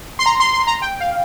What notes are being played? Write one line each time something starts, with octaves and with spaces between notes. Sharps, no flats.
C6
A#5
C6
C6
A#5
G5
F5